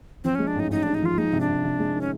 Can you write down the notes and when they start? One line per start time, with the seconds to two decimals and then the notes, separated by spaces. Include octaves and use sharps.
0.24 F3 C4
0.35 G#3 C#4
0.47 D4
0.55 A1 D#4
0.70 A1 D#4
0.83 G#2 D4
0.94 D#4
1.03 F3 F4
1.18 G#3 D#4
1.33 C3
1.41 D4
1.49 C3
1.64 C3
1.79 G#3
1.95 D#3
2.01 C#4